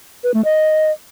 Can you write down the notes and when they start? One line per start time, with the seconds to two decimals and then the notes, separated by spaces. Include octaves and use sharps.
0.24 B4
0.34 A3
0.45 D#5